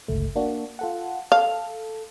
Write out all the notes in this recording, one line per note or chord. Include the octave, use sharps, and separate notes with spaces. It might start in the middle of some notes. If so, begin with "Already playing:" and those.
G1 C#2 A3
A#3 D4 F#4
F4 A4 F#5
A4 F5